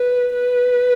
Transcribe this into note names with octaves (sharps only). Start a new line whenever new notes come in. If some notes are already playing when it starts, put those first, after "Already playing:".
Already playing: B4
B4